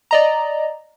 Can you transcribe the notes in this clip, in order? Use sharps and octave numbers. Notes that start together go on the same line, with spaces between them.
D5 D#5 A#5